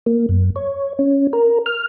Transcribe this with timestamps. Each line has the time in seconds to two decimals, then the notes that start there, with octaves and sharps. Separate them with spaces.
0.06 A#3
0.29 F#2
0.56 C#5
0.99 C#4
1.33 A#4
1.66 F6